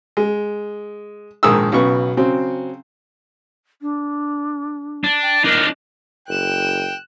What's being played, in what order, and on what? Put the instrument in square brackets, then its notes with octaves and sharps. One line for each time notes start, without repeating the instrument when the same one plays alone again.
[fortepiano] G#3
A#1 G#2 D#3 G#4 D#6 E6
B1 C#3 B3 C#6
C#3 F#3 C4
[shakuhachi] D4
[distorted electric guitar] D4
[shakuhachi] G5
[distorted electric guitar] D4 D#4 [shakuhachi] A#4
[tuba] F#1 [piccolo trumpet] G5 [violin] F#6 E7